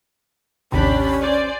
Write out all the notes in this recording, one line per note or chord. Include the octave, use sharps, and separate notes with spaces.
A1 D#2 C3 C#4 D4 G4 B5
C5 D5 G#5